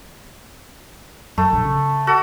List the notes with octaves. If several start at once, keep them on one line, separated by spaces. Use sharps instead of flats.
F#2 A3
A#1
C#3
F#4 A4